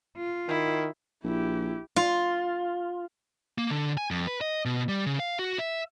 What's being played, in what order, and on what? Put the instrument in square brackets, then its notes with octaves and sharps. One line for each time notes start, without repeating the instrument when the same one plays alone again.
[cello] F4
[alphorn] D#3 [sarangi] E4
[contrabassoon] A#1 [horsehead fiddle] E4 G4
[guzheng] F4
[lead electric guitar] A#3
D3
G#5
F2
B4
D#5
B2
G3
C#3
F5
F#4
E5